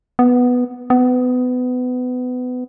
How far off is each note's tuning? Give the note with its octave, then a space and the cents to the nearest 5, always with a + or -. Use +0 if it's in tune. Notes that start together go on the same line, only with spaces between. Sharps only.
B3 +0
B3 +25